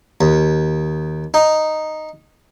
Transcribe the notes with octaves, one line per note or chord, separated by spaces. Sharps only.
D#2
D#4